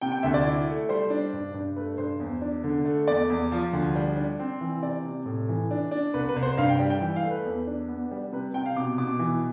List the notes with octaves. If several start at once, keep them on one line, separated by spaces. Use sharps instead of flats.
C3 G5
G5
D2 E5
D5
E4
A3
G3 C5
D4
G2
G2
A3 B4
G2 C5
E2
D4
D3
A3
E2 D5
E2
F3
D2
G3
D4
C4
E3
C3 D5
C3
A2
E3
D4
D4
C2 B4
B4
C2
C5
G2 F5
G5
G3
G5
E3 G5
F5
A3
B4
E2
D4
B3
G3
C3 B4
C3 G5
F5
B2 D6
B2 D6
E3